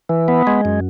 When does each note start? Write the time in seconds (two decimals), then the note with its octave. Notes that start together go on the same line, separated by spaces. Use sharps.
0.09 E3
0.28 B3
0.47 G#3
0.65 F#2